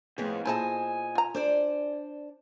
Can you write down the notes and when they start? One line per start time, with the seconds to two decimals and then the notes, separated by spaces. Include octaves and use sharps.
0.18 F2 A2 B3 G#4
0.45 A#2 E4 G#4 A4 C5 D#5 G#5
1.15 F4 A#5
1.34 D4 C5 D5